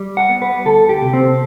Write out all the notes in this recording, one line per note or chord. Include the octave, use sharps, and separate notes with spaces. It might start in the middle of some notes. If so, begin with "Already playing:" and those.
Already playing: G3
F#5
B3
B4
D2 A4
G4
C3
C4